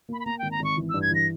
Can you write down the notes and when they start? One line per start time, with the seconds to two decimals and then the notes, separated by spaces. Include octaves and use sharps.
0.09 A#3 B5
0.20 B5
0.26 A#3 A#5
0.39 G#1 G5
0.51 A#5
0.60 G#1 C#6
0.77 E3
0.90 G2 E6
1.02 G#6
1.11 E3 A#6